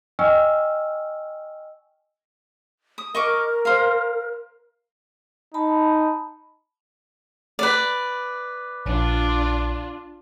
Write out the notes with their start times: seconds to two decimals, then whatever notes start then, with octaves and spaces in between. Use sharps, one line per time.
0.19 D#5 G5 G#5 C#6 E6 F6
2.98 D#6
3.15 A#4 D#5 C#6 D6
3.65 C5 F5
5.54 D#4 A5 B5
7.59 B4 D5
8.86 A#1 D4 F4